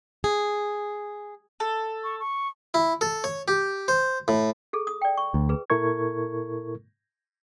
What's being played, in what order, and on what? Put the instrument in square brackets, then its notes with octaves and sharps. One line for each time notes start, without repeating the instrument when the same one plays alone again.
[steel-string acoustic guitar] G#4
[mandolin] A4
[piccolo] C#6
C#6
[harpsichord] E4
A4
C#5
G4
C5
A2
[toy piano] G#4 A4
D#6
D5 G5
C#6
[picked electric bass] D2
[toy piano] G#4 B4
[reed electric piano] A#2 E4 A4 A#4 C#6 G#6